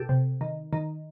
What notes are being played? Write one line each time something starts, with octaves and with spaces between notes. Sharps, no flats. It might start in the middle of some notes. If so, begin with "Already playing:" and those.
Already playing: B2 G4 A4
C3
D#3
D#3